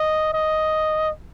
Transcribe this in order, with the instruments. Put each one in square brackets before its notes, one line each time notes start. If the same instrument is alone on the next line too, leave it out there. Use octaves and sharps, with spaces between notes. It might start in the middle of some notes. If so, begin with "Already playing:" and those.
Already playing: [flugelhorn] D#5
D#5